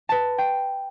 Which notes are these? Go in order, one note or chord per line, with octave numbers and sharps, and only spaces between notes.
B4 A5
G5